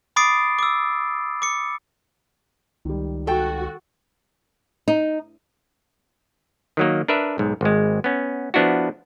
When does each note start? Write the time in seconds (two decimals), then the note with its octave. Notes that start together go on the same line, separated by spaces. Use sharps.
0.16 B5 D6 D#6 A6 C7 D7
0.59 D6 E6
1.42 D6 C#7
2.85 C#2 D#3 G3
3.27 F#4 A4 G5
4.88 D#4
6.77 D#3 F#3 A#3
7.08 D4 A#4 B4 E5
7.38 B1 G#2
7.61 G#1 G#3
8.04 B3 C#4
8.54 F3 B3 D4 E4 F#4